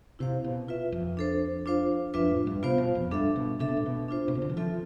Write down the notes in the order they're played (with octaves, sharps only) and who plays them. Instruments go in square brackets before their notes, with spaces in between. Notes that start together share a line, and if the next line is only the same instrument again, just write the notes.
[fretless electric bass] C3 [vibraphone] E4 G4 C5 F5
[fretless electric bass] B2
[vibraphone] F4 B4 E5
[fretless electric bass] F2
[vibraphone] D4 A4 C5
D4 F4 C5 F5
[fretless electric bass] F2 [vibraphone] D4 F4 B4 E5
[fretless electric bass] A2
G2
[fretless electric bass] C3 [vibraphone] B3 F4 C5 F5
[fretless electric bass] B2
F2
[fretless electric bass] G2 [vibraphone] D4 A4 E5
[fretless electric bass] B2
[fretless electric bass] C3 [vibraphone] D4 A4 E5
[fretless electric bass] B2
A2
B2
[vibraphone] D4 F4 C5
[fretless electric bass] B2
C3
D3
E3
[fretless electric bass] F3 [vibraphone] C4 F4 A4 E5